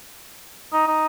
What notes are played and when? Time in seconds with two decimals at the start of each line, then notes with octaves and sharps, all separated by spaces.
0.73 D#4
0.88 D#4